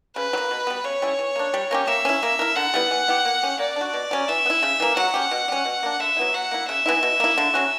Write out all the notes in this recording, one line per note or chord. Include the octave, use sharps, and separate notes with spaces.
C#3 B4
F#3
A#3
B2
G3 B3
C#3 C#5
G3 C#4 E4
E3
A#3 D4
G3
A#3 C#4 G4
A#3 E5
C#4 E4
A#3
E4 A#4
D3 F#5
G3 B3 E4
E3
B3 E4 G4
A#3
C#4 G4
A#3 D5
D4 F#4
B2
F#3 C#4
E3 E5
B3
E4
C#3
E3 A#3
F#3 F#5
C#4 G4
B2
G3 C#4
B2
A#3 D4
D3 E5
F#3 B3 E4
F#3 F#5
A#3 E4
C#3 E5
E3 B3 E4
B2
A#3 E4
D3
F#3 C#4 F#4